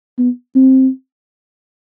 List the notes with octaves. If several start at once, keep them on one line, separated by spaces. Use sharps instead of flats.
B3
C4